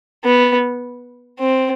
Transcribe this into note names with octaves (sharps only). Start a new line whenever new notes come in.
B3
C4